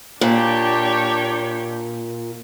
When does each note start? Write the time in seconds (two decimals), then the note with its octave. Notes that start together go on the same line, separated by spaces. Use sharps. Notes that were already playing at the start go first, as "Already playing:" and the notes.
0.21 A#2 D4 G4 C#5